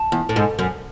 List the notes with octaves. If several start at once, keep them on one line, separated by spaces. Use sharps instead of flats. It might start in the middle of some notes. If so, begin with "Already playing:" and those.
Already playing: A5
E2
A2
G#2
F#2